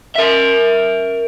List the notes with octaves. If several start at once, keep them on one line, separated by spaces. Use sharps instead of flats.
A#4 E5